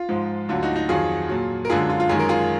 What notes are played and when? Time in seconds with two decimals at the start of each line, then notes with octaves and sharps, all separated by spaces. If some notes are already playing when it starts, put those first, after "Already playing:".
Already playing: F4
0.09 G#2 F3 G#3
0.49 D2 D3 F#3 F4
0.63 D#4 F#4
0.76 D#4 F#4
0.89 F2 D#3 F#3 F4 G#4
1.29 A#2 F#3
1.65 A#4
1.70 F#2 D3 G#3 F4 G#4
1.90 F4
2.00 F4
2.09 F#2 D#3 G#3 G#4
2.19 A#4
2.29 F4 G#4